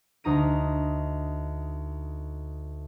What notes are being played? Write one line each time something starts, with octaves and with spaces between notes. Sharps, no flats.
D2 D#4 A#5 D#7